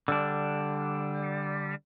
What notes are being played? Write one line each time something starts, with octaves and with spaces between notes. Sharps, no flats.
D3 G3 D4